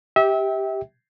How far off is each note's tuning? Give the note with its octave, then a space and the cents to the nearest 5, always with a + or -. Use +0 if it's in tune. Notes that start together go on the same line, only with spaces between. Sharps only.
G4 +0 E5 -30 G5 +0